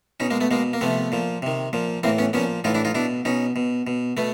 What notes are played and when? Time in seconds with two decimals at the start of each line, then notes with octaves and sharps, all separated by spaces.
0.20 B2 C#4 D#4
0.30 G#3 A#3
0.41 A3 B3
0.51 B2 G#3 A#3
0.73 A#3
0.81 C3 F3 A3 B3
1.12 A#2 F3
1.42 C3 D#3
1.73 A#2 F3
2.03 A2 E3 A#3 C4
2.18 B3 C#4
2.33 A#2 F3 B3 C#4
2.64 A2 E3 D#4 F4
2.74 D4 E4
2.85 D#4 F4
2.95 B2 D4 E4
3.25 B2 C#4 D#4
3.56 B2
3.87 B2
4.17 B2 A3 B3